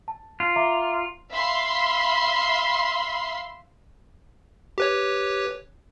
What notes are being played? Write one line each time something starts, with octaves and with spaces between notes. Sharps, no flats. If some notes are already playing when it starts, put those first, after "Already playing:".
A5
F4
E5 A#5 D6
E5 F5 B5 C6
G4 B4 C#5